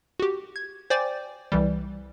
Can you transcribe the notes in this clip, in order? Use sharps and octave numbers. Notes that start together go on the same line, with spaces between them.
F#4 G4
G#6
C5 D5 G5 G#5 D6 A6
C2 E3 G3